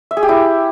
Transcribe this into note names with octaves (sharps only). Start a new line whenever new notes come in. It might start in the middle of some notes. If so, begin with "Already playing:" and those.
E5
G#4
G4
E4